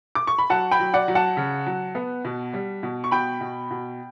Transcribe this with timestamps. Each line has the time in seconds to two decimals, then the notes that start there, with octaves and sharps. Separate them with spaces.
0.15 D6
0.27 C#6
0.38 B5
0.50 F#3 F#5 A5
0.71 G5 B5
0.80 F#3
0.94 D5 F#5
1.08 F#3
1.15 F#5 A5
1.37 C#3
1.67 F#3
1.95 B3
2.25 B2
2.54 G3
2.83 B2
3.04 C#6
3.11 B2 G5 B5
3.41 B2
3.71 B2